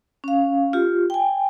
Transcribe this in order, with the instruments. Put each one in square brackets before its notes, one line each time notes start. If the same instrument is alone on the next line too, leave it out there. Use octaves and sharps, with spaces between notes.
[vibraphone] C#4 F5
F4 G4
G5 G#5